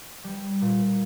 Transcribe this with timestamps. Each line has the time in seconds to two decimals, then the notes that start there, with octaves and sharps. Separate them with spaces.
0.24 G3
0.62 A#2